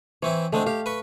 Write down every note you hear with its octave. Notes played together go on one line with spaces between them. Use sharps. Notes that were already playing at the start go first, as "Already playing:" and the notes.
E3 C4 E4 C#5
D3 G#3 A3 C4
G4 F5
B4 B5 C#6